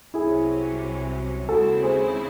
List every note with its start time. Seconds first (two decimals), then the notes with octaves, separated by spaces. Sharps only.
0.14 C2 C3 F#3 C#4 E4 G#4
1.49 D#2 C#3 G#3 C4 E4 F#4 A4
1.83 G#4 C5